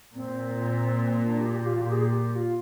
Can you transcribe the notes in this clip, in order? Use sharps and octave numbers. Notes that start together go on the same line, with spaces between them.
A#2 C4
D4
G4
G4
F4
A#2 G4
G#4
G4
F4